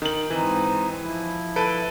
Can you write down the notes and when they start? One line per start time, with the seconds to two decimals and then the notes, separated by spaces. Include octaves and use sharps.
0.02 D#3 F#7
0.30 G#2 E3 C4 D#4
1.00 F3 E4
1.56 A4 B4 D7